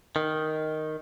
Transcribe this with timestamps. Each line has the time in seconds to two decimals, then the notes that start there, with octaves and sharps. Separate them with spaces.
0.16 D#3